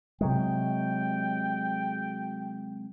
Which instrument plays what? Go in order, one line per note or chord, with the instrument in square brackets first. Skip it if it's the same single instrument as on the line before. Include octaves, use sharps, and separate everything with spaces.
[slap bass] C3 F#3 G#3 [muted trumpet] G5